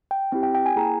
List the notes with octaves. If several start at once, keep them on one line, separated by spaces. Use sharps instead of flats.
G5
C4 E4 G4 G5
G5
G5
G#5
A#3 E4 G#4 A#5